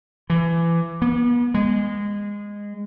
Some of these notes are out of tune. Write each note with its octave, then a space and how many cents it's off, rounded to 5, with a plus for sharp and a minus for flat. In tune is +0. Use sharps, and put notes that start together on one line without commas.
E3 +25
B3 -40
G#3 -20